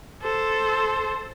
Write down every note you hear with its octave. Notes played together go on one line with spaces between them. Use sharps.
A4 C5